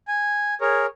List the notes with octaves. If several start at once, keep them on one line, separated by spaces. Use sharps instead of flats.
G#5
G#4 A#4 C#5